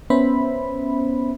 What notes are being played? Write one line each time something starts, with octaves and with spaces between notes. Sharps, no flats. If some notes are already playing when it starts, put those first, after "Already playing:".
B3 C#4 C5 E5 B5